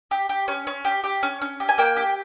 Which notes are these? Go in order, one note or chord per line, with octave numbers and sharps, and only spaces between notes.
G4
G4
C#4
C#4
G4
G4
C#4
C#4
G4
G#5
A#3 G5
G4